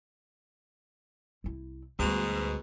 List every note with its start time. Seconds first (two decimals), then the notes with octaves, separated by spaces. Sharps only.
1.44 C2 E4
1.99 D2 G#2 B2 G3